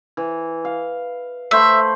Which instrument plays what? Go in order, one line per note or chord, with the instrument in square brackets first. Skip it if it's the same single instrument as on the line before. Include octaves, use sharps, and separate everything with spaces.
[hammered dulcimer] E3
F5
[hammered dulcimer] A3 C5 B5 [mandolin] E5